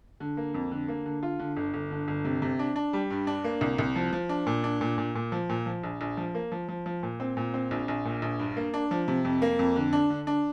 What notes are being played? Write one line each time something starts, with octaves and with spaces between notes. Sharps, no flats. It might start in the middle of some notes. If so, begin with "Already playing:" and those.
D3
A#3
F2
D3
A#3
D3
F4
D3
G1
G1
D3
G1
C3
C3
D4
D4
G3
G2
D4
A#3
C2
C2
F3
F3
D4
A#2
D4
A#2
A#2
A#2
F3
A#2
F3
A#1
A#1
F3
A#3
F3
F3
F3
A#2
C4
A#2
C4
A#1
A#1
A#2
A#1
G2
A#3
D4
F3
C3
F2
A#3
F2
D3
D4
D3
D4